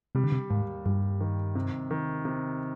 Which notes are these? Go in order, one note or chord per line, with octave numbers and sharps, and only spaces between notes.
C3 G3
D3
C3
D#2 G#2
G2 G3
D#3
C3
D#3
C3